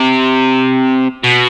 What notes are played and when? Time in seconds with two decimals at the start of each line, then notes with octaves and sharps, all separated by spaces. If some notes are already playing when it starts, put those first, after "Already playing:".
Already playing: C3
1.24 B2